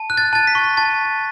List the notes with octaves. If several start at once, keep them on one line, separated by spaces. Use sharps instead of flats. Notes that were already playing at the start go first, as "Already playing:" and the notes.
Already playing: A5
F#6
A6
A5 A6
B6
C#6
A5 A6